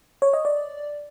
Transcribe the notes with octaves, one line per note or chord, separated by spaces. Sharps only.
C#5
D#5
D5